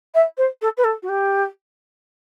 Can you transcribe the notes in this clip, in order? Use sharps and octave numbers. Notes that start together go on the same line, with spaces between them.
E5
C5
A4
B4
A4
F#4
G4